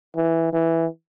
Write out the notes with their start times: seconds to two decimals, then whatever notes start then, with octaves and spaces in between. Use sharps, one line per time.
0.16 E3
0.53 E3